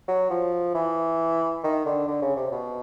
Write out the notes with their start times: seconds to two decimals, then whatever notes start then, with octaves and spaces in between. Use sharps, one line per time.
0.08 F#3
0.30 F3
0.75 E3
1.64 D#3
1.86 D3
2.07 D3
2.22 C#3
2.36 C3
2.51 B2